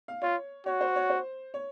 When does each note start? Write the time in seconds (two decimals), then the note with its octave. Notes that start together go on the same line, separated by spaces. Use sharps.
0.08 F5
0.22 F4 C#5
0.66 F#4 C#5
0.81 C5
0.96 C#5
1.10 C5
1.54 C#5